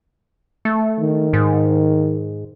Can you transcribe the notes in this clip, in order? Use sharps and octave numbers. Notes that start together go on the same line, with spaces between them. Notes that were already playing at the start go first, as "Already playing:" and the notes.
A3
D#3
G#2